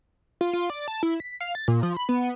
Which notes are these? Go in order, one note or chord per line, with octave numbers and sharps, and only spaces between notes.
F4
F4
D5
A5
E4
B6
F5
A6
A#2
F3
B5
B3